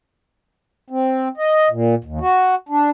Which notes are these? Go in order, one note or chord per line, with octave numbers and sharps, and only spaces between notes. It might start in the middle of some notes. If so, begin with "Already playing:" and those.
C4
D#5
A#2
D#2
F#4
D4